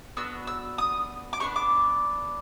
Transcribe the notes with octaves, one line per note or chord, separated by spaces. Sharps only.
B3 D4 F#4 E6
E6
D#6
D6
B3 D4 G4 C#6
D6